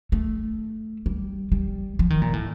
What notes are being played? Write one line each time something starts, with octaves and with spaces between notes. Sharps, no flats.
A3
G3
G3
F3
D#3
A#2
A2